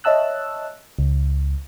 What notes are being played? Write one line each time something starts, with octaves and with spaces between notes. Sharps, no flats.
C#5 D#5 E5 A5 E6 F#6
C#2